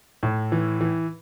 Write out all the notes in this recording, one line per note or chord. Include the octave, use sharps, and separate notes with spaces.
A2
E3
E3